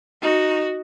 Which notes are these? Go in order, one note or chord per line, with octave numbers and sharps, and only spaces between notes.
D#4 F#4